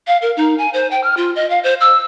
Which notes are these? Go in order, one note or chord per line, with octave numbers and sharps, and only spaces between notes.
F5
A#4
D#4
G#5
C5
G5
F6
F4
D#5
F5
C5
E6